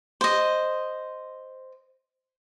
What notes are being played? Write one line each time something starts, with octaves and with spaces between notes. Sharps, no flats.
C5 D#5